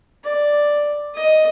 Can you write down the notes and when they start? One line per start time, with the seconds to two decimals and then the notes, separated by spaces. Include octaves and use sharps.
0.24 D5
1.15 D#5